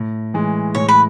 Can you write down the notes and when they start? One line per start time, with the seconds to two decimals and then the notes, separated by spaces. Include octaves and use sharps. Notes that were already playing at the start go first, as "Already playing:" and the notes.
Already playing: A2
0.34 E3 G#3
0.75 A2 C#5
0.88 B4